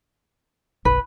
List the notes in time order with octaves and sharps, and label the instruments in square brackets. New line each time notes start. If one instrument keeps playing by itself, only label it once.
[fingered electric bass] F#1 B1 [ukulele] B4